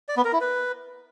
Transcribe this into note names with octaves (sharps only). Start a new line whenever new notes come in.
D5
B3
A#4
E4
B4